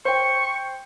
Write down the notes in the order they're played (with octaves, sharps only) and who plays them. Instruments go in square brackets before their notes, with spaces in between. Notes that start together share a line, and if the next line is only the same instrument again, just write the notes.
[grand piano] C5 G5 [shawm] C#6